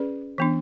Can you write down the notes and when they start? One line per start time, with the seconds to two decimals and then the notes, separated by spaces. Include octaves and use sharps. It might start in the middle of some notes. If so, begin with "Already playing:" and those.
Already playing: C#4 G#4 B4 D5
0.38 E3 B3 D4